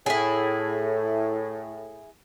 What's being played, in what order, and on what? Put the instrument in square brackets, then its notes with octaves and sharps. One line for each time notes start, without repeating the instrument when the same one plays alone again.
[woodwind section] A2 [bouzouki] E4 G#4